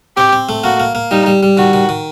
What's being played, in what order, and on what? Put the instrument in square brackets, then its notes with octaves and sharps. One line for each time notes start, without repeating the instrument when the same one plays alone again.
[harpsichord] C4 [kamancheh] G4
[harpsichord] C4
A3
[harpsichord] A#3 [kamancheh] F#4
[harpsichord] A#3
A#3
[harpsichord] G3 [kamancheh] D#4
[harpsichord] G3
G3
[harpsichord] D#3 [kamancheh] F#4
[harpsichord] D#3
D#3